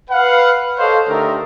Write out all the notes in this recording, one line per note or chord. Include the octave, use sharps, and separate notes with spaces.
B4 F5 F#5
A4 C5 C#5 D#5 F5
D3 A3 D#4 G4 A#4